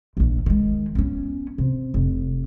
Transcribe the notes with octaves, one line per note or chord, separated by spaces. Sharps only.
A#1 E2
D#3 G#3
B3 C#4
C3
F1